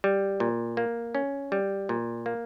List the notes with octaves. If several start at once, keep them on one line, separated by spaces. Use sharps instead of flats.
G3
A#2
A#3
C#4
G3
A#2
A#3